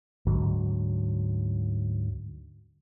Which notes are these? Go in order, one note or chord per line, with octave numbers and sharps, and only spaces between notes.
D2 G#2 D3 F#3